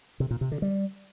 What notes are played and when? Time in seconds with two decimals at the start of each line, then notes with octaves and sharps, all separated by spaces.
0.20 C3
0.31 A#2
0.41 C3
0.52 D3
0.62 G3